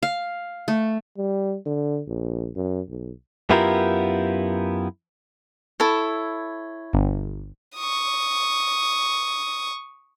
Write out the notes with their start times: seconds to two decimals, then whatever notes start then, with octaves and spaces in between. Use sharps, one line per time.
0.03 F5
0.68 A3
1.18 G3
1.66 D3
2.08 A#1
2.56 F#2
2.89 B1
3.50 F#2 B3 E4 F4 G4 A#4
5.80 E4 A4 C#5
6.93 G1
7.76 C#6 D#6